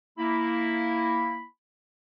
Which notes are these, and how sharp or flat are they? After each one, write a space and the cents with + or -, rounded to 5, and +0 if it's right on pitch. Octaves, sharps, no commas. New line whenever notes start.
A#3 +0 E4 +0 B5 +0